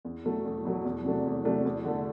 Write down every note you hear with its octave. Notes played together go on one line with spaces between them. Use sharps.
E2
B2 F#3 A3
E2
B2 F#3 A3
E2
C3 F#3 A3 D4
E2
C3 F#3 A3 D4
E2
D3 A3